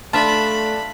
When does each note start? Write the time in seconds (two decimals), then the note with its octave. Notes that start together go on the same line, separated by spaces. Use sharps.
0.13 A3 D4 F4 E5 A5 B5